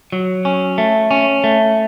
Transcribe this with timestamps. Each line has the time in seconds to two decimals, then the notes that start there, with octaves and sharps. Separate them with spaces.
0.12 F#3
0.45 C#4
0.78 A3
1.11 C#4
1.44 A3